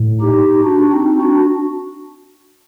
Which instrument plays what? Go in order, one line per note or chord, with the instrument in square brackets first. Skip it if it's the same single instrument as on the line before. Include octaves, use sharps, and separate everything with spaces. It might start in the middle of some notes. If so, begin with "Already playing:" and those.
Already playing: [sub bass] A2
[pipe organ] D#4 G4
D4 F#4
C4 D#4
D4 F#4